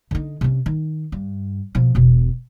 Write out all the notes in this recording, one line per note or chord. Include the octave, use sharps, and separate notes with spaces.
D3 D#4
C3 C#4
D#3
G2
B2 F3
E1 B2